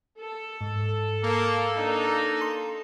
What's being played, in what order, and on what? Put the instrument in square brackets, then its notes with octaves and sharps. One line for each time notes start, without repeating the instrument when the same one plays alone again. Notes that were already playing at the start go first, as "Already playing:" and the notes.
[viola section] A4
[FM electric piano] G#2
[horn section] A#3
A#3 D4 D#4
[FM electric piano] C6